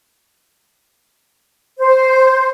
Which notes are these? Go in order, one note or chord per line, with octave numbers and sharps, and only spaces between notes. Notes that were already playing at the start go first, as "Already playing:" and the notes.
C5